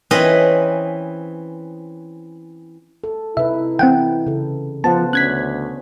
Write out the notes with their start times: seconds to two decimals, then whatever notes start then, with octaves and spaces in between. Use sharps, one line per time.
0.11 E3 C4 C#4 B4 D#5
3.04 A4
3.37 C3 D#4 E4 B4 E5
3.79 E3 C4 F#5 G5
4.27 C#3 A4
4.84 F3 B3 C5 F#5 A5
5.13 D2 C#4 F#6 G#6 B6